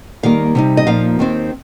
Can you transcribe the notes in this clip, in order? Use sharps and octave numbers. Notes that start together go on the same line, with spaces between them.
D#2 D#3 G3 A#3 F5
C3 G3 D#4
D#5
A#2 F3 A#3 D#4 F5
D#2 D#3 C4